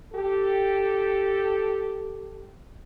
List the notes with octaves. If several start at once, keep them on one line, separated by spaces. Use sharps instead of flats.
G4 A4